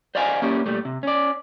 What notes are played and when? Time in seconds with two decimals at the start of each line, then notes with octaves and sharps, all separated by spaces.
0.15 C5 D5 D#5 F5 G5 G#5
0.42 A#3 C#4 E4 G4 D5
0.66 A#2 G3 A3
0.85 C3
1.03 C#4 D5